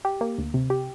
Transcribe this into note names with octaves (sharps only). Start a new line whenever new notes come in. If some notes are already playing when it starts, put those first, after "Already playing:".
G4
A#3
D2
C3
G4